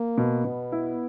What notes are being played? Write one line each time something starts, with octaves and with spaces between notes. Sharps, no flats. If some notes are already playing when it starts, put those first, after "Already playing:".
Already playing: A#3
B2
B2 B3
E4